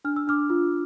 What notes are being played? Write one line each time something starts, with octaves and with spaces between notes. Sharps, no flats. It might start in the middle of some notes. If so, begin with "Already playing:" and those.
D4 F6
E6
D4 D6 F6
F4